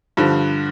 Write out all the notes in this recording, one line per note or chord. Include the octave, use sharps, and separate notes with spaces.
G2 D3 F3